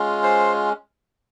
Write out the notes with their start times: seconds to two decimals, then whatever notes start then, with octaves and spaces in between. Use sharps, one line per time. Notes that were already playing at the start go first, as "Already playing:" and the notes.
Already playing: G#3 C#4 F4
0.23 C5